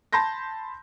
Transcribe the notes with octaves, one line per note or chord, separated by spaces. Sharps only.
A5 B5 C6 G6 A#6